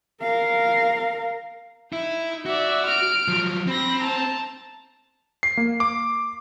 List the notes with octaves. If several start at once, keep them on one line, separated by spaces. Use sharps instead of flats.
A#4 F5
D#4 E4
F#4 D5 E5
F6 D7
F3 F#3
C4 B5 A#6
A5 A#5
C7
A#3
D6